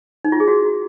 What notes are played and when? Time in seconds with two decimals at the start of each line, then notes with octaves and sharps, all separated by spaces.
0.25 D#4
0.32 F4
0.40 G#4
0.48 F#4